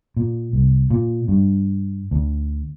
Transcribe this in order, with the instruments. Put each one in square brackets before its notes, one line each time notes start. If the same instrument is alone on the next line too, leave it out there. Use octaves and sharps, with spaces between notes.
[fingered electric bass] A#2
C2
A#2
G2
D2